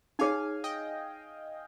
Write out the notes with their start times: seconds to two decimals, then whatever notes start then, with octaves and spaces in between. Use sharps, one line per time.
0.19 D#4 G#4 C#5 F5 G#5
0.64 D#5 G5